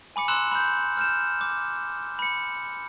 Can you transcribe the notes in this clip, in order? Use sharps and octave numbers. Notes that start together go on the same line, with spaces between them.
G#5 B5 D6 C#7
A#5 C6 E6 F#6 E7 F#7
B5 G6
F6 G6 E7
D6
B5 C#7